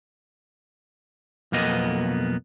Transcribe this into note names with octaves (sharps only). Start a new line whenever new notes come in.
B1 F2 A#3 B3 D#5